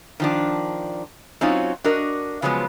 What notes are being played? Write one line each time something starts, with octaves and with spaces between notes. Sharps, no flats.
D#3 F3 D4
F#3 C4 C#4 D#4 F4
D4 F#4 A#4 D#5
C#3 F3 F#3 G#3 B3